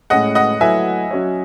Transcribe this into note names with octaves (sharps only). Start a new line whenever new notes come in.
A2 G#3 C#4 G#4 D#5 F#5
D#5 F#5
F#3 A3 E4 B4 E5 G#5
F#3 C#4 F#4 C#5